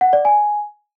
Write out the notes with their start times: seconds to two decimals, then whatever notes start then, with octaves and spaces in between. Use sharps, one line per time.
0.01 F#5
0.13 D5
0.25 G#5